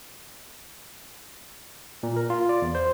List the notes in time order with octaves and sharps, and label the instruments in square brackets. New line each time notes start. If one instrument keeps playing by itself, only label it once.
[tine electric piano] A#2
A#4
F4
D5
E2
C5